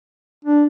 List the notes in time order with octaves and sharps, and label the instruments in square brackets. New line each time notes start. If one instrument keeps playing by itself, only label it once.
[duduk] D4